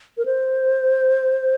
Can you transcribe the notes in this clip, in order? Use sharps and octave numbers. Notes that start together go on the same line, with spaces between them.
A#4
C5